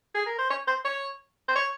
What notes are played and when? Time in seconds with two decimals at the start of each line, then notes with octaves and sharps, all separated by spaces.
0.15 G#4
0.26 A#4
0.38 C5
0.50 C#5
0.68 C5
0.85 C#5
1.48 C5
1.56 C#5